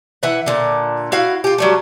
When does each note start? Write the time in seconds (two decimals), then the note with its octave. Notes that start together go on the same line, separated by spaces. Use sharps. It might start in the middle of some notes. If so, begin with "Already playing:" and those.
0.23 E3 E5 F#5
0.46 A#2 D3
1.12 E4 F#4 F5
1.44 F4 G4
1.58 F#3 G3 A3